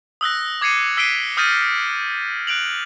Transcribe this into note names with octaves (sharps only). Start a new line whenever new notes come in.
D#6 E6 F#6 A#6
D6 G#6 C7 C#7 D#7 E7
E6 B6 C7 D7 D#7 G7
D#6 F6 G6 A6 A#6 D#7
F#6 D7 F7 F#7